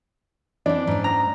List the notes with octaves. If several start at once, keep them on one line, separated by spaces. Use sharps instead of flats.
E3 C4 D4
G#2 C#4
A#5